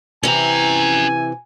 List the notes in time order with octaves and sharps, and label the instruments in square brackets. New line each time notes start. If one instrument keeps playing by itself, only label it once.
[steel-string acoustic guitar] C3 E3 [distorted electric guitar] C#4 A#5 [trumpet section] G#5